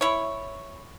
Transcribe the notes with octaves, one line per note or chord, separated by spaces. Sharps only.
E4 C#5